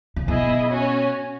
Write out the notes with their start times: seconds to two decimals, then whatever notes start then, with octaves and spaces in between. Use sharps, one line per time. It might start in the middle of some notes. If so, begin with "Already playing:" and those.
0.16 C#3
0.28 B2 E4 G#4 D#5
0.70 C#4 F#4 C#5 G#5